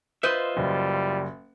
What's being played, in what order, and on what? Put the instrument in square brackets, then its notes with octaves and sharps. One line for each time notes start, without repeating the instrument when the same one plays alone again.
[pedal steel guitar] F4 D#5 E5 [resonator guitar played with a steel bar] B4 C5
[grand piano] F#1 [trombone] G3